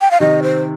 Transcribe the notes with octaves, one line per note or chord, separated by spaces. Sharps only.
G5
F5
C3 D#3 D#5
C5